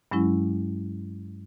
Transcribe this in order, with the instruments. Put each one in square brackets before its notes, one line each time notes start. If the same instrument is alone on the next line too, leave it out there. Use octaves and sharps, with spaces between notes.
[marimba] G2 F#3 G#3 C#4 E4